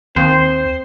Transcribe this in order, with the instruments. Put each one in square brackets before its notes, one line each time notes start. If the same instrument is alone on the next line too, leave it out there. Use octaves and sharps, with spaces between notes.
[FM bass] D#2 [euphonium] C4 [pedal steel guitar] C5